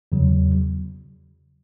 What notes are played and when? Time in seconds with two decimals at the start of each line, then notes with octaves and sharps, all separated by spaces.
0.12 E2 C#3 F#3